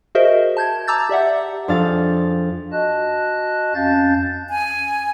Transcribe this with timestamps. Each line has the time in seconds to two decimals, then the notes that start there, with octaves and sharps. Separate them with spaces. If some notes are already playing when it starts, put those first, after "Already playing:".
0.15 F#4 G#4 A#4 C5 D#5 E5
0.57 A5 G6 G#6
0.87 A5 A#5 D6 E6 G6 A6
1.09 G4 D5 E5 F#5
1.68 F2 D4 G#4 F5 A6
2.72 F#4 D#5 A5 F#6
3.75 F2 C#4 F5 A5 G6 A6
4.50 G#5